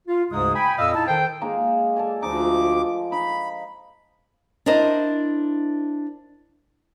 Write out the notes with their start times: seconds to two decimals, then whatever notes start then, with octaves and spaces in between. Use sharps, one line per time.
0.08 F4
0.31 D2 G#2 C#3 G#3 D#4 D#6
0.56 G5 G#5 B5
0.78 F2 A#2 D#5 F5 D#6 E6
0.95 D#4 E4 A5
1.08 D#3 A4 C5 G5
1.41 G#3 A#3 D#4
1.96 A4 D5 G#5
2.22 D2 F3 D#4 D6
3.12 D#4 B5
4.66 D4 E4 A#4 C5 D#5